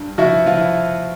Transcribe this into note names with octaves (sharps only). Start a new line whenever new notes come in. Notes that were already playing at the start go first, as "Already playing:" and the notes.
Already playing: G2
F3 E4 F#4
F3 F4
E4